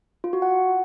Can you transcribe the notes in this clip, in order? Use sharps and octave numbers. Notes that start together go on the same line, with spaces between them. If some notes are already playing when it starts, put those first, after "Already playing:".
F4
F#4
F#5